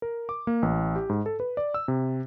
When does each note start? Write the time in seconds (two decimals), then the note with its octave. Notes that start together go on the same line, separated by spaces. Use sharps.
0.02 A#4
0.29 D6
0.47 A#3
0.62 A1
0.96 G4
1.10 G#2
1.26 A4
1.40 B4
1.57 D5
1.74 E6
1.88 C3